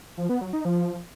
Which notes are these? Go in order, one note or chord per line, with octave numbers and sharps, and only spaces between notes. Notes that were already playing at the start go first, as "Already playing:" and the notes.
F3
B3
F#3
D#4
F3